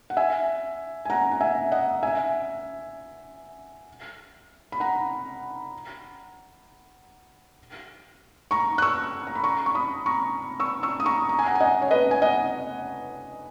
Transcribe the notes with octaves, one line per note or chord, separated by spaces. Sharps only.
F#5
E5 G#5
G#5
F#5 A#5
F#5
E5 G#5
D#5 F#5
E5 G#5
B5
F#5 A#5
A#5 C#6
F#6
C#6 E6
A#5
B5
A#5 C#6
C#6
B5 D#6
A#5 C#6
C#6 E6
C#6 E6
D#6
A#5 C#6
A#5
G#5
F#5 A#5
G#5
D#5 F#5
C#5
B4 D#5
G#5
D#5 F#5